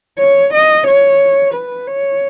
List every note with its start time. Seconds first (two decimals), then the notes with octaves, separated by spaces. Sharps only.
0.18 C#5
0.53 D#5
0.87 C#5
1.54 B4
1.87 C#5